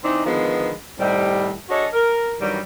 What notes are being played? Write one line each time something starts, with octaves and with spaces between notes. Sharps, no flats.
E3 C4 D4 D#4
D3 D#3 F3 G#3 B3
A2 C3 D#3 G3
D4 F#4 G#4 A4 C#5 D#5
A#4
G2 D#3 E3 F#3 G3